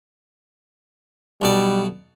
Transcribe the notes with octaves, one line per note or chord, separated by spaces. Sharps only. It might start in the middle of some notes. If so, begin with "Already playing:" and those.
B1 B2 G3 D5